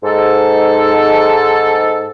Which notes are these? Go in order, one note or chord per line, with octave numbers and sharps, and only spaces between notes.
G#2 A4